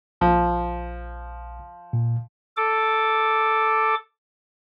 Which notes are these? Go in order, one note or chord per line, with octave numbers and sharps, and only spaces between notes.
A#1 F3
A#2
A4 D6